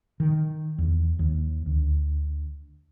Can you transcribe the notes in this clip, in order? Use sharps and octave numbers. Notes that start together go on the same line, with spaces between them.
D#3
E2
D#2
D2